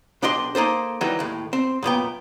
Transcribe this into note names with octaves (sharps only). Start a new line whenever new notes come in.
B1 D4 G4 D#5 C6
A#3 D#4 A4 C5
D#3 E3 F#3 G3 D#4
D#2 A2
C4
F#2 A#2 B3 G5